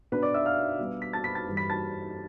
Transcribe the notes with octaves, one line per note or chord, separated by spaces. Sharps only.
B2 B3 D4 B4 B5
D5 D6
E5 E6
F5 F6
B2 G3 B3 D4
B6
A5 A6
B5 B6
A5 A6
G2 E3 G3
B5 B6
A5 A6